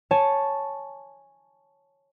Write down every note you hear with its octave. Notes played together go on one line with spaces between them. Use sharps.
C#5 G#5 A5